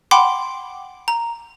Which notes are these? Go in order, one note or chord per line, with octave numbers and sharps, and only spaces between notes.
F#5 G5 B5 C6 D6
A#5